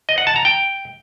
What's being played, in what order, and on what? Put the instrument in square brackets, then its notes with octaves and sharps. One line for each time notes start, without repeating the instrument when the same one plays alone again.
[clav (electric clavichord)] D#5
F#5
A5
A#5
G5